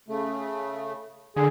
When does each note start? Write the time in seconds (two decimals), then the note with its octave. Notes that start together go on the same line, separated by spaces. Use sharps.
0.08 C#3 A3
1.36 D3 G#4